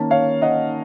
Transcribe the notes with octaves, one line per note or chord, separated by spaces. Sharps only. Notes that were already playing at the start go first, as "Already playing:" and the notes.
Already playing: D#3 A#3 C#4 A5
C#5 F5
D#5 F#5